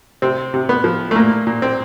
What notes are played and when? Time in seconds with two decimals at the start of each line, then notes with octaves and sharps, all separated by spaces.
0.22 C3 C4
0.54 C3
0.69 B3
0.84 F3
1.11 A3
1.15 A#2 A#3
1.47 A#2
1.62 C4